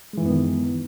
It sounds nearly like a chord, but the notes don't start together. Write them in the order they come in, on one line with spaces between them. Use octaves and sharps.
G#3 E3 F#2 B3 D#3